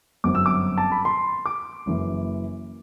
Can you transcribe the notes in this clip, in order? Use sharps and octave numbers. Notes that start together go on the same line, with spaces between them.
G1 F#2 F#3 C4 D6
E6
D6
A5
B5
C6
D6
F#1 F#2 E3